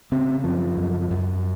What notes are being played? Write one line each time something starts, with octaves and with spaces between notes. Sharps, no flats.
C#3 C4
F#2 F3
F#2
F#2